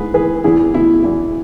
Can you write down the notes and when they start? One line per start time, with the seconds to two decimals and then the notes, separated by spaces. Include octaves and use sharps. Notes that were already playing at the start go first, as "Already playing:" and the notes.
Already playing: G#2 B3 G#4 B4
0.13 E3 G#4 B4
0.44 E2 E4 G#4
0.74 B2 E4
1.04 E2 E4